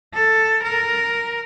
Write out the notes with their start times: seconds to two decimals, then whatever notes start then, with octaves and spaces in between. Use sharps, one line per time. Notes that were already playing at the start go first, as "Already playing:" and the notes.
0.14 A4
0.63 A#4